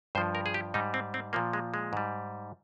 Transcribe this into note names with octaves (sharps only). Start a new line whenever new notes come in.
G2 F3 C5
A#4
G#4
G4
G#2 G3 D#4
C4
C4
A#2 F3 A#3
G#3
G#3
G#2 G3